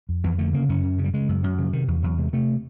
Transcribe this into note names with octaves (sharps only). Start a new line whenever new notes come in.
F2
F2 E3
D3 A3
C#3 A#3
F#2 C#4
F#2
C#3
G3
C#3 G#3
F#2
F#2 F#3
C#3 F3
C3 D#3
E2 F3
E2 F#3
C3 G#3
C3 A3